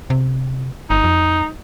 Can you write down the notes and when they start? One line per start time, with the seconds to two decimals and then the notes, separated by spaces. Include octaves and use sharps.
0.10 C3
0.90 G1 D#4
1.04 F2